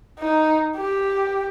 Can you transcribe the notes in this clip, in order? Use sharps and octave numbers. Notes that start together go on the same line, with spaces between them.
D#4
G4